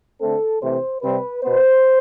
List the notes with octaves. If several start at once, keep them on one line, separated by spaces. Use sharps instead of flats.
D3 A3 C4 A4
C3 E3 A3 C4 C5
C3 G3 C4 B4
B2 B3 C5